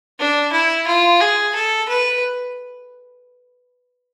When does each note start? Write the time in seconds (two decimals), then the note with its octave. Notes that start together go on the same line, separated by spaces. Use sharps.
0.19 D4
0.53 E4
0.88 F4
1.21 G#4
1.55 A4
1.89 B4